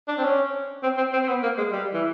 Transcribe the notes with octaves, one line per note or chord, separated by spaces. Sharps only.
D4
C4
C#4
C4
C4
C4
C4
B3
A#3
G#3
G3
E3